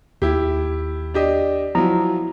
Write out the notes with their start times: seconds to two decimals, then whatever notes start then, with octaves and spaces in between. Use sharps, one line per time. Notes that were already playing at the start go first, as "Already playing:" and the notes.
0.22 D#2 E4 G4
1.14 D4 G4 D#5
1.75 F3 F#3 E4 A#5